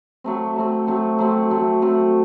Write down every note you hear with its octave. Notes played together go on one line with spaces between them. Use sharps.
F#3 A3 C4
F#3 A3 C4
F#3 A3 C4
F#3 A3 C4
F#3 A3 C4
F#3 A3 C4